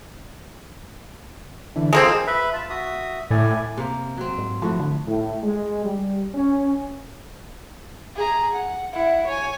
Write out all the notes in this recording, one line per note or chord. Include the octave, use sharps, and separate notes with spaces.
D3 E3
G#3 A#3 C4 F4 G#4 A4
B4 E5 B5
F4 A5
F#4 E5 D#6
A2 E4 D5 G#5
C3 A#3
F#3 C4
G#2
A2 F3 A3 F#4
D3
A2
G#3
G3
C#4
G#4 A#5
F#5
E4 F#5
C#5 G#5